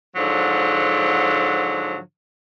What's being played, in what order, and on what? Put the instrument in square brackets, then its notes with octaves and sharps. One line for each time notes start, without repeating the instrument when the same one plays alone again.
[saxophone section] G#2 D3 F3 F#3